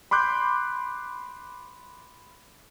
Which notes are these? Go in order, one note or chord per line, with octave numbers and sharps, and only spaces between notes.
B5 C6 D6 F#6 G6